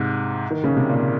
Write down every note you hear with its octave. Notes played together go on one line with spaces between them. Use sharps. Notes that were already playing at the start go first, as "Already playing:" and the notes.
Already playing: G#2 C3
D#3
C#3
C3
A#2